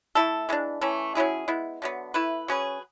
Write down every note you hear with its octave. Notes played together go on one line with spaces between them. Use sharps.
A3 E4 A4
E3 G#3 D4
E3 A3 C#4
F#3 C#4 E4 G#4
G#3 B3 E4
D3 F#3 B3
A3 E4 B4
F#3 C#4 G#4 B4